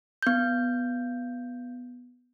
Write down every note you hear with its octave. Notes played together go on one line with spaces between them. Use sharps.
B3 G6